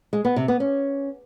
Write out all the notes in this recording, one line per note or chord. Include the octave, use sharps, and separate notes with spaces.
G#3
B3
C3
B3
C#4